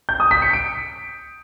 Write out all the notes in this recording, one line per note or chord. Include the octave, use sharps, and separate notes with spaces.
G6
D#6
B6
C#7
D7